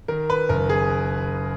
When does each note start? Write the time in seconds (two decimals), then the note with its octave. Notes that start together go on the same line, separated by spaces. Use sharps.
0.08 D#3 A#4
0.30 B4
0.49 F#1 A#4
0.70 G#4